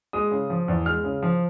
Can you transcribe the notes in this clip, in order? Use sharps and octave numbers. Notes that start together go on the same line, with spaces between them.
G#3 D#6
C#3
F3
E2
G#3 F6
C#3
F3